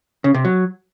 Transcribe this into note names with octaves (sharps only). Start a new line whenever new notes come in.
C#3
C3
F#3